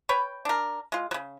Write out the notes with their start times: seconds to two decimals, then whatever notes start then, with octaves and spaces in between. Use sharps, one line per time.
0.09 B4 C#5 G5
0.45 D4 A#4
0.92 G#3 F4
1.11 C#3 F#3